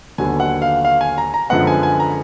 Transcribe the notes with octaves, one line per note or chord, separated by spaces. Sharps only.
D#2 D3 F#3 B3 G#5
F#5
F5
F5
G#5
A#5
A#5
F#2 D3 F3 G#3 B3 F#5
G#5
G#5
A#5